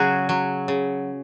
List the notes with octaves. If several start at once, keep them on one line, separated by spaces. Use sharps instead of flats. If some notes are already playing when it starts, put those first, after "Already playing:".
Already playing: C#3 F#3 F#4 G#4
F#3
C#3